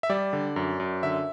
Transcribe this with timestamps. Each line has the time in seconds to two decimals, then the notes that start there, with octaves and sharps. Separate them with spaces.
0.03 E5
0.09 G3 D5
0.33 D3
0.56 F#2
0.80 F#2
1.03 D3 E5